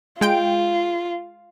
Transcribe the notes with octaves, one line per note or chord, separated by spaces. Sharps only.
G#3 F4 G5 D7